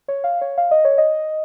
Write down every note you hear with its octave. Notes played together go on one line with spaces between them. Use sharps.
C#5
F5
C#5
F5
D#5
C#5
D#5